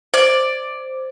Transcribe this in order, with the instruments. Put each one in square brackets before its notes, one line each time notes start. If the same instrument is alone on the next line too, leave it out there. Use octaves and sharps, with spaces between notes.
[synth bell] C5 [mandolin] D5